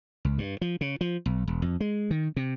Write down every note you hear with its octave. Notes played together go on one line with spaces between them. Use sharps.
C#2
G2
F3
C#3
F3
B1
E1
F2
G#3
D#3
C3